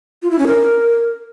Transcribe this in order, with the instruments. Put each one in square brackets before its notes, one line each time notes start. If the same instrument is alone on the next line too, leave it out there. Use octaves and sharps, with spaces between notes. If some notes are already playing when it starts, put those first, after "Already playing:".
[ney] F4
E4
C#4
A#4